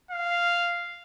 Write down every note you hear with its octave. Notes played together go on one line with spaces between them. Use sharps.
F5